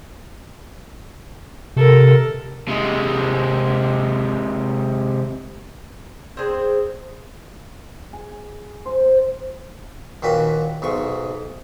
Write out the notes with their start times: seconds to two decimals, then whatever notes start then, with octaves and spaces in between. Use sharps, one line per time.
1.76 C3 A4 A#4
2.68 C3 G#3
6.37 C4 D4 G#4 C5
8.13 G#4
8.86 C5
10.23 D#2 A#2 F#4 B4
10.82 B1 G#2 C#6